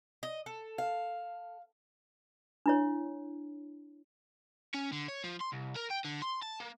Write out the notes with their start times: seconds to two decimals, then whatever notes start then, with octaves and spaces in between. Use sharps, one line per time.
0.23 D#5
0.46 A4
0.78 F5
2.66 D4 E4 C#5
4.75 C#4
4.92 D3
5.08 C#5
5.24 F3
5.40 C6
5.52 C2
5.76 A#4
5.90 G5
6.04 D3
6.22 C6
6.42 A5
6.60 A#3